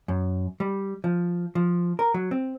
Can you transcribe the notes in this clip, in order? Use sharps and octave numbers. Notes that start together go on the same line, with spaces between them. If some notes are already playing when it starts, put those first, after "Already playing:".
F#2
G3
F3
F3
A#4
F#3
C4